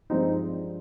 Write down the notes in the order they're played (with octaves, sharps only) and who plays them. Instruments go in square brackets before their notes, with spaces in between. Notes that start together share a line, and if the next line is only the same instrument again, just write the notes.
[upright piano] G2 F3 G#3 C4 D#4